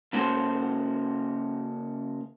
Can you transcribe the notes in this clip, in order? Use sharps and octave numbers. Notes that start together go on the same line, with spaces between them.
C#3 A#3 C#4 F#4 A4 C5